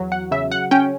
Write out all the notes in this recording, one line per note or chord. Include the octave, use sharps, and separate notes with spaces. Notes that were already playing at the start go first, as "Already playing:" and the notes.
Already playing: E2 F#3
F#5
C#3 E5
F#5
C#4 G5